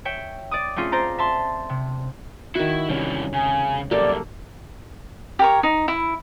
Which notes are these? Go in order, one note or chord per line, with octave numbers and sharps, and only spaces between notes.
C#5 E5 G5
D5 D6 D#6
A3 C4 C#4 F4 G#4
C5 D5 A#5
E5 A5 C6
C3
D#3 E4 F#4
E1 C3 E3 G3 C#4
C#3 G#5
C2 F#2 A#3 G4 A4 D5
G4 A#4 C#5
D#4
E4